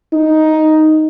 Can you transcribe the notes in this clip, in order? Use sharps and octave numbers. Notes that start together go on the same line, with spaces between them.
D#4